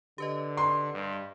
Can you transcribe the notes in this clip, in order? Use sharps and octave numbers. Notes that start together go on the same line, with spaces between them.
D3 G4 B4 D#5
C6
G2